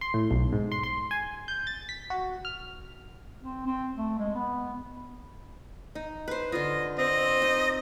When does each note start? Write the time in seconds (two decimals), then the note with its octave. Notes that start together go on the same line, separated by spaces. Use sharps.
0.01 C6
0.14 A2
0.31 B1
0.52 G#2
0.72 C6
0.83 C6
1.11 G#5
1.48 G6
1.67 A6
1.89 B6
2.10 F#4
2.45 F6
3.41 C4
3.66 C4
3.96 A3
4.19 G#3
4.35 B3
5.95 D#4
6.28 B4 C5
6.52 D3 F4 D#5
6.98 C4 D#5
7.42 D#4